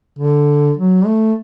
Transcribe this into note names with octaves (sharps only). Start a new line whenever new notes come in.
D3
F#3
A3